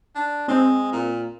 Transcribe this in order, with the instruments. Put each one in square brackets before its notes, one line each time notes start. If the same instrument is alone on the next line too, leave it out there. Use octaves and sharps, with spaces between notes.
[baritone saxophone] D4
[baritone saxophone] G#3 [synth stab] C4
[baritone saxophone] A#2